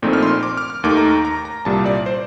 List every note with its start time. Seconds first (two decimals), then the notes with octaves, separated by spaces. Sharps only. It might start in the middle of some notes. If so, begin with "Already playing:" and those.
0.02 A#1 A#2 A3 C4 D#4
0.13 F6
0.23 C6
0.43 D6
0.57 F6
0.70 F6
0.84 D#2 D#3 A3 D#4 D6
0.97 A#5
1.11 A#5
1.25 A#5
1.45 A#5
1.65 C2 A#2 G3 A5
1.86 D5
2.06 C5